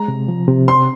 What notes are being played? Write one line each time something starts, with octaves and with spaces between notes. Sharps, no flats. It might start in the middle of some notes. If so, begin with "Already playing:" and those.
Already playing: G#3 A#5
C3
F3
C3
C4 C6